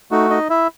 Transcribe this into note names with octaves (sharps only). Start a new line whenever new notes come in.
A3 D#4 F#4
D#4 D#5
E4 E5